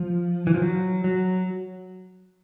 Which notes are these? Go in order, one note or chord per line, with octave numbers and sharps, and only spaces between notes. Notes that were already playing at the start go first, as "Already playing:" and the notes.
Already playing: F3
E3
F3
F#3
F#3